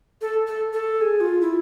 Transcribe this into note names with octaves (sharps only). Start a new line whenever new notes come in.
A4
A4
A4
G#4
F4
E4